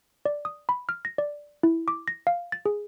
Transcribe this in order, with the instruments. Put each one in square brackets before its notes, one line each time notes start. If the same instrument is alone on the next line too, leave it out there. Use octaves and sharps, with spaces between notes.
[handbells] D5
D#6
B5
F6
A#6
D5
E4
D6
A#6
F5
A6
G#4